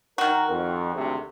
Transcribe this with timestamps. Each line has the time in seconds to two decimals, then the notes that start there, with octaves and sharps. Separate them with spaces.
0.18 D#3 F#4 A#4
0.50 F2
0.94 G#1 D2 C3